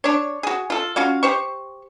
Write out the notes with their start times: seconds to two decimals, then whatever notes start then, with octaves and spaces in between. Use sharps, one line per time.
0.04 D4 C#5
0.43 F#4 G#4
0.70 F4 A4
0.96 C#4 F4 F#4 F5
1.23 G4 C5 C#6